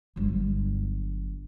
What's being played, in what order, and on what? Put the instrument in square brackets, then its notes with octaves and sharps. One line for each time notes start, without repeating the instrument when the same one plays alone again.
[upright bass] G1 F#3